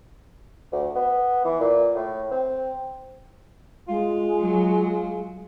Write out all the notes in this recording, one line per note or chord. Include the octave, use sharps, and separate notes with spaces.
D2
B3
E3
A#2
A2
C4
G#3 F4
F#3